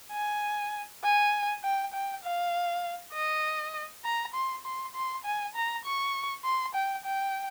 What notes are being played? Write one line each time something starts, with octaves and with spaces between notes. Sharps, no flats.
G#5
G#5
G5
G5
F5
D#5
A#5
C6
C6
C6
G#5
A#5
C#6
C6
G5
G5